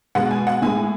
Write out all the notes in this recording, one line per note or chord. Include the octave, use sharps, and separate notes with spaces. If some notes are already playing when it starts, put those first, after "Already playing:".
B2 G#3 F#5
G#5
F#5
A2 G#3 G#5